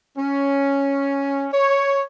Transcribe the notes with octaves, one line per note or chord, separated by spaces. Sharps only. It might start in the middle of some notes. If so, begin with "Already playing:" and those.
C#4
C#5